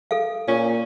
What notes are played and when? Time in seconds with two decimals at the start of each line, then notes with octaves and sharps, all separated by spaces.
0.11 A4 F5
0.48 A#2 C#4